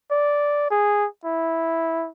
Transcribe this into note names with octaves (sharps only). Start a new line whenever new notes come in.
D5
G#4
E4